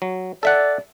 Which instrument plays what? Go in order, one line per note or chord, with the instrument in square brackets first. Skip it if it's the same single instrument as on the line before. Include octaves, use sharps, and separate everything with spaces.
[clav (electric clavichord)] F#3
[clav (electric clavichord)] A4 E5 F#5 [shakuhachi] D5